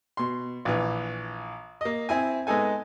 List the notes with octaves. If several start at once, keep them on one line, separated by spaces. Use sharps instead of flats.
B2 C6
A#1 E3
A#3 D#5
C4 E4 G#5
G#3 B3 D#4 A4 G#5